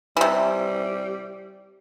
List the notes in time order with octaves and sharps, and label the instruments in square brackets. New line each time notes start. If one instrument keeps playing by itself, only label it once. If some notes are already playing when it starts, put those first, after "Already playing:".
[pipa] C3 E3 [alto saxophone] G3